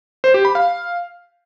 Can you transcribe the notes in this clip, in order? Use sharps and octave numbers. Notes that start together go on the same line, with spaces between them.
C5
G4
B5
F5